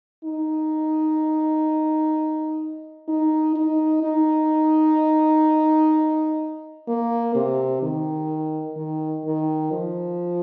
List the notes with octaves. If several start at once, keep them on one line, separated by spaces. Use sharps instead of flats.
D#4
D#4
D#4
D#4
A#3
C3
D#3
D#3
D#3
F3